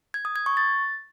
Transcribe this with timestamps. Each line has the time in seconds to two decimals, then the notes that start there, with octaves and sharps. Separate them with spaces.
0.14 G#6
0.25 D#6
0.36 G#6
0.46 C#6
0.57 A6